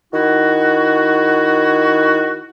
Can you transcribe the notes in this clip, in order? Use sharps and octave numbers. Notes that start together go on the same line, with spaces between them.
D#3 E4 F#4